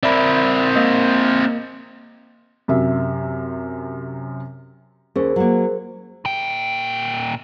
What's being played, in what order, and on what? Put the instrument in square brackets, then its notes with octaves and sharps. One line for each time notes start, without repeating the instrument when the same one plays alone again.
[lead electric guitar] C4 A#4 [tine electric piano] D5 E5 B5
[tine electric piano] A#3 D#5
[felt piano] F#2 C3 E5
[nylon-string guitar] D#2 C#4 [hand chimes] G#4 A#4 C5
[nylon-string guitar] F#3 A#3
[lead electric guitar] A#2 G5